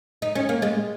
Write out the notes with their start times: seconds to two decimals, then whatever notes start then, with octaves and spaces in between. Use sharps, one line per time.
0.22 D#4
0.35 C#4
0.49 A#3
0.62 G#3